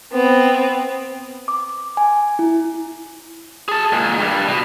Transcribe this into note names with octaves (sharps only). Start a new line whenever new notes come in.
B3 C4
D6
G#5
E4
G#4 A5
A#2 G#3
G2 G3
B2